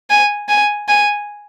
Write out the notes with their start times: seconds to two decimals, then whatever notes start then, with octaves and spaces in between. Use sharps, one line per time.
0.10 G#5
0.49 G#5
0.88 G#5